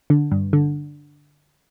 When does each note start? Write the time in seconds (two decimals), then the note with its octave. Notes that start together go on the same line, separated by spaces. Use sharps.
0.10 D3
0.31 G2
0.53 D3